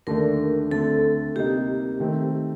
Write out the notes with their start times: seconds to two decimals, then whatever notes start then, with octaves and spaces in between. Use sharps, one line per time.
0.07 D#2 D3 A3 D4 A#4
0.70 D2 D3 A3 C4 A4
1.36 C3 G3 A#3 D#4 G4
2.00 D#3 A3 C4